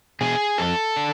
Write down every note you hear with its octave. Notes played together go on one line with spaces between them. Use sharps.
B2 G#4
F2 A4
D3